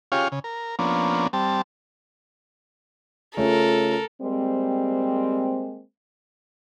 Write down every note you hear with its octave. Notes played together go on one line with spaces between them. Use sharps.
C#4 F4 G4 G#4 C#5 F5
C#3
A#4
F3 A#3 B3 C#4 D4
G3 C4 A5
C#3 A3 C#4 F4 A4 A#4
G3 G#3 A#3 C4